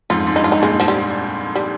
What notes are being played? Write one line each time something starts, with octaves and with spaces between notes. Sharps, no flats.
F2 G#2 F4
G#2
G2 D#4
F4
D#4
G2 A#2 G#3
F3
G3
G3